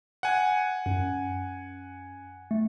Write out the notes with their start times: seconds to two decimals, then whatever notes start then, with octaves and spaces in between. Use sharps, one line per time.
0.23 F#5 G#5
0.86 F#2
2.51 A3